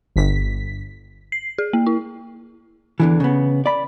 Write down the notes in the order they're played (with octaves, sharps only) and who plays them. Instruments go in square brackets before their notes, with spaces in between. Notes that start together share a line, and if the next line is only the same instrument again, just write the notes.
[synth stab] G1 B6
[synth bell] C7
G#4
A#3
E4
[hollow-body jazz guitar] E2 D3 E3
C#3 B3
D5 B5